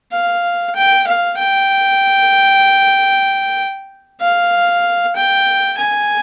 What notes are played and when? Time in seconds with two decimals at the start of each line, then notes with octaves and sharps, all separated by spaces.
0.12 F5
0.75 G5
1.07 F5
1.38 G5
4.21 F5
5.16 G5
5.78 G#5